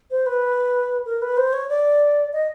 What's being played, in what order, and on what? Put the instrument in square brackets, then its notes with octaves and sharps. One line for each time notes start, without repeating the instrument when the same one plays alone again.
[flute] C5
B4
A#4
B4
C5
C#5
D5
D#5